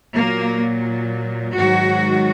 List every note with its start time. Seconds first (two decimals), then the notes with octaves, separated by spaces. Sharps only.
0.16 A#2 F#3 A#3
1.54 G#2 D#3 F#3 F#4